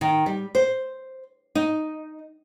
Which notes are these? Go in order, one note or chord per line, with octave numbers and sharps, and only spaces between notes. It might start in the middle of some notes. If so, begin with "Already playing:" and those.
D#3
G3
C5
D#4